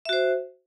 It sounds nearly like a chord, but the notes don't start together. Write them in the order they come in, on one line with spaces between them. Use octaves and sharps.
E5 F#4 C5